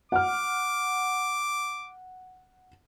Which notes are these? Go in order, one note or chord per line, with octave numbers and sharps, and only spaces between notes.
F#5 D6 F6